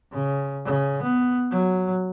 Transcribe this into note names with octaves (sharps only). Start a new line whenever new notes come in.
C#3
C#3
B3
F#3